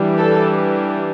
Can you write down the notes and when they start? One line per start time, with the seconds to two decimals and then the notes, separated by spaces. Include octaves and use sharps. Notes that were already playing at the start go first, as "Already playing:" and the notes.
Already playing: E3 G3 D4
0.18 A4